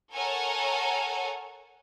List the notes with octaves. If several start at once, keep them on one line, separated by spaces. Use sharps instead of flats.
A4 A#4 C#5 F#5 G#5 A#5